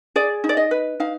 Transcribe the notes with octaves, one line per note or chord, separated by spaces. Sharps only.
G#4 D5
D#4
D5
D#5
B4
D#4 F5